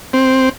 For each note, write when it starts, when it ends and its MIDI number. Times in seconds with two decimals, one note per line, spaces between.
0.13 0.49 60